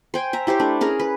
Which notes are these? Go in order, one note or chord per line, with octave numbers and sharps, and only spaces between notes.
C5 G5 G#5
E5 A#5
E4 G4 C5 C#5
A3 D4
C#4 G#4 A#4
B4